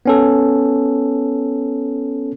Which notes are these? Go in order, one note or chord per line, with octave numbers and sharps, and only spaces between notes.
B3 C#4 A4